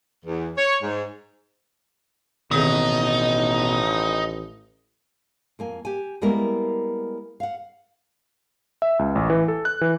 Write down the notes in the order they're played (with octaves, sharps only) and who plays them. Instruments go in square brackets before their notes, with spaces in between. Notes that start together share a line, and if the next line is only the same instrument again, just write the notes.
[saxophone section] E2
C#5
G#2
[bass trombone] A1 [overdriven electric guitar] B2 [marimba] D#3 C4 G#4 [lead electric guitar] D#4
[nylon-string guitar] F2 A#3 G#5
G4 G#5
G3 G#3 A#3 B3 E4 A#4
F5 F#5
[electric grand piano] E5
C#2
A1
E3
A4
F#6
E3